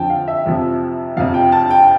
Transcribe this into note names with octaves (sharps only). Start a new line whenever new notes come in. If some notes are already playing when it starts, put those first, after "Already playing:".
Already playing: F2 D3 F3 G5 A5
F5
E5
F2 C3 F3
F2 C3 F3 F5
G5
A5
G5